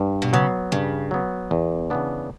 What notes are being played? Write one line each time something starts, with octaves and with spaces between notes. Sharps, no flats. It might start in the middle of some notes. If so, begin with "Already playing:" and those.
Already playing: G2
B2
C#3 F#3 B3
G2 C#3
F#3 B3
E2
C#3 E3 B3 D4